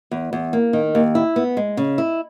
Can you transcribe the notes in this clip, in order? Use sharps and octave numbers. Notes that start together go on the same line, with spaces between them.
E2
E2
A#3
D#3
D#2
E4
B3
G#3
C#3
E4